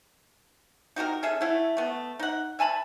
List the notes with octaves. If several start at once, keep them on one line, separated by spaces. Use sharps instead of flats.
D#4 F#4 G4 A#4
C#4 G#4 A4 E5
A3 E4 F#5
A3 B3
D#4 F#5
E5 G#5 A5 B5